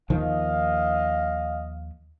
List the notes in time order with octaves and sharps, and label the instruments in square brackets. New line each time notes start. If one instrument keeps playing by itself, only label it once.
[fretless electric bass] D#2 D#3 F3 [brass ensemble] D#5 F5